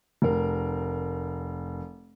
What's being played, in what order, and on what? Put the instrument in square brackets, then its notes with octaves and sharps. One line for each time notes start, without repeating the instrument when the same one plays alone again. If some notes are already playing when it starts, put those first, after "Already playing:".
[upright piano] F1 A#4